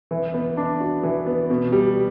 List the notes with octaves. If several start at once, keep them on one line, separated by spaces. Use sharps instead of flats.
E3
B3
D4
F#4
E3
B3
B2
G3